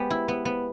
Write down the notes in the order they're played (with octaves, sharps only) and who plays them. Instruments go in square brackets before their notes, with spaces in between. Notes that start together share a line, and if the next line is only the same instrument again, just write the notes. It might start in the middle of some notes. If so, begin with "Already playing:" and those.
Already playing: [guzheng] G#3 B3 G4
E4
B3
B3